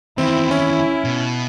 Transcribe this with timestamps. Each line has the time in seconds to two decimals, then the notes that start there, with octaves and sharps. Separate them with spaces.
0.18 E2 D#3 C4 E4
0.51 C#4
1.04 B2